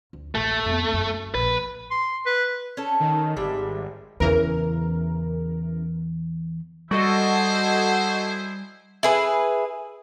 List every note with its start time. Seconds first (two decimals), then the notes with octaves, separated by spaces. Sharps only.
0.13 D2
0.35 A1 A3
0.66 F2 B3
0.92 F#1 F#2
1.35 A#1 B4
1.91 C6
2.26 B4
2.77 C#4 A4
3.00 D#3
3.37 G#1 G3 G#3 E5
4.20 E2 C#3 E3 A#4
6.91 G3 E4 F#4 G#4 A4 C5 D#5
9.03 E4 G#4 B4